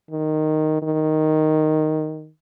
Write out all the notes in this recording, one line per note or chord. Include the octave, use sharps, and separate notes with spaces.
D#3
D#3